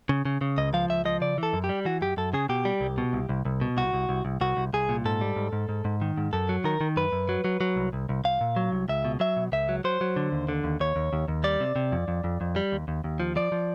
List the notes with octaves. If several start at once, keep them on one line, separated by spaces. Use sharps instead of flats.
C#3
C#3
C#3
C#2 D#5
F3 F5
C#2 E5
F3 D#5
C#3 D5
E3 A4
F#2
G4
G3
E3 F#4
F#2 G4
F#2 A4
C#3 G#4
B2 G4
G3
C2
B2
C2
C2
C2
B2
C2 F#4
C2
C2
C2
C2 F#4
C2
C2 G#4
A#2
G#2 A4
G3
G#2
G#2
G#2
G#2
D#3
G#2
F#2 A4
F#3
D#3 A#4
D#3
F#2 B4
F#2
F#3
F#3
F#3
C2
C2
C2
C2 F5
A#2
F#3
C2
C#2 E5
B2
F#3 E5
B2
C#2 E5
F#3
F#3 C5
F#3
D3
D#2
D3
D#2
D#2 C#5
D#2
D#2
D#2
G3 D5
C3
C3
F2
F2
F2
F2
G3
D#2
D#2
D#2
F3
F3 D5
F3